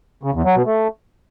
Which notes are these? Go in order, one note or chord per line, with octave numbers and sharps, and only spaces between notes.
C#3
E2
F#3
B2
A3